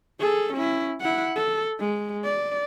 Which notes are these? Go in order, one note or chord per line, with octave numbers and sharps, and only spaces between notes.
G#4 A4
C#4 E4
E4 F#5
A4
G#3
D5